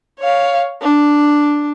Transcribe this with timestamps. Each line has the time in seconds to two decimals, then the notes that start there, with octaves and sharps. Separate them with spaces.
0.19 C#5 F5
0.82 D4